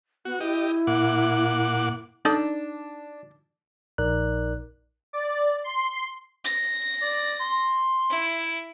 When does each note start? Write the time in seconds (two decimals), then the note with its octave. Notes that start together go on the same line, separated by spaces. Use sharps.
0.25 B3 F#4
0.41 E4 G4 D#5
0.87 A#2 F#5 D6
2.25 D4 D#4 A4 D5
3.98 A#1 D#4 A#4 D5 F#6
5.13 D5
5.64 C6
6.45 A#6
7.02 D5
7.40 C6
8.10 E4